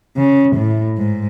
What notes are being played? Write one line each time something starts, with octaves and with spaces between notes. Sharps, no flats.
C#3
A2
G#2